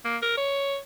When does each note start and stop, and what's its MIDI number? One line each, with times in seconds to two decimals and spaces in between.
0.05 0.17 58
0.22 0.36 70
0.37 0.77 73